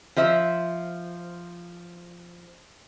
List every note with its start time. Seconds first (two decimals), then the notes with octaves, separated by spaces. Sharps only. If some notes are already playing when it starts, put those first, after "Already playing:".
0.16 F3 C5 E5